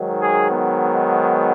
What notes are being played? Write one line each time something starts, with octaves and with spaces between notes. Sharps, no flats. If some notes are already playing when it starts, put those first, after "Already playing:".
Already playing: G#2 D#3 F#3
G#4
B3